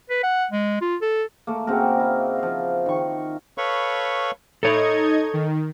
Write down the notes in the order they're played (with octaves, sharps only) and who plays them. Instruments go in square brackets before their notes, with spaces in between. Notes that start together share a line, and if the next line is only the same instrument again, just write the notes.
[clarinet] B4
F#5
G#3
F4
A4
[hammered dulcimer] A3 A#3
C#3 C4 F#4 A#4
E4 D#5
F3 F5
D#3 C#6
[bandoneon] A4 B4 C#5 F5 B5 C#6
[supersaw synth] D#4 D#5 G#6 [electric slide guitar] A4 C#5
[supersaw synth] D#3